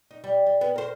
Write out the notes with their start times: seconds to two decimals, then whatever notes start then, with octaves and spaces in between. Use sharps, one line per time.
0.11 D#4
0.24 G3
0.46 G3
0.61 B3
0.76 A#4 C5